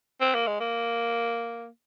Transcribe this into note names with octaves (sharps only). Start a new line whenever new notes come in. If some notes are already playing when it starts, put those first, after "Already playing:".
C4
A#3
G#3
A#3